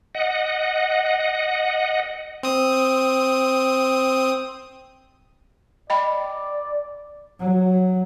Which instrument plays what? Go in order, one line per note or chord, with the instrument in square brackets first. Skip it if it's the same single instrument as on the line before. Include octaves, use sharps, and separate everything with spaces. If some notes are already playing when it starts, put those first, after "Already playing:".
[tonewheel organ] D#5 F#5
[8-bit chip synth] C4 D#6
[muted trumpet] D5 [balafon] D#5 G5 B5
[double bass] F#3